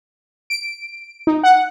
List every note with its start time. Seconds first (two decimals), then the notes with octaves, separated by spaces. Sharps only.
0.50 D7
1.27 D#4
1.43 F#5